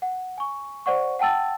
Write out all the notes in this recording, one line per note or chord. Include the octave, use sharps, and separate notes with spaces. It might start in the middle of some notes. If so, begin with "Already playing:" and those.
F#5
G#5 C#6
C5 D5 F#5 C#6
F#5 G5 A5 E6 A6